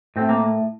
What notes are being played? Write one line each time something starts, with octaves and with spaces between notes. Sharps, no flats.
A2 C4
A#3